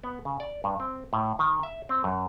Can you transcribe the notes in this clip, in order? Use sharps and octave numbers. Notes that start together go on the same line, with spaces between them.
B3
C#3
D5
G2
C4
A2
D#3
E5
C4
F#2